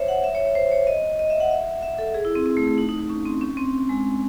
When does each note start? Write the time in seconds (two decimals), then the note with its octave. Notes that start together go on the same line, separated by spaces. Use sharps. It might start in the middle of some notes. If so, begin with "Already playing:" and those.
Already playing: C5 C#5 E5
0.08 F#5
0.24 E5
0.35 C#5
0.45 C#5
0.55 C5
0.71 C#5
0.87 D#5
1.19 D#5
1.30 E5
1.40 F#5
1.51 E5
1.83 E5
1.98 A4
2.14 G#4
2.25 E4
2.35 C4
2.46 C4
2.57 A3
2.68 A3
2.78 D#4
2.89 D#4
2.99 D#4
3.10 C#4
3.25 C4
3.41 C#4
3.57 C4
3.89 G#3